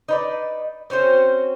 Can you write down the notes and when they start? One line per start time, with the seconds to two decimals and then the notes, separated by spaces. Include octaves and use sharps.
0.09 D#4 B4 D5
0.90 C4 C#4 F#4 C5